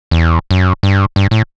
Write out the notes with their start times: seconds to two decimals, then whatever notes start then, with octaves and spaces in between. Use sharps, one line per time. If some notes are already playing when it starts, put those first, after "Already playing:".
0.11 E2
0.51 F#2
0.83 G2
1.16 G2
1.31 A2